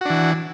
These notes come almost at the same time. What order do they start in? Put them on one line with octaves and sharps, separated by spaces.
F#4 D4 E3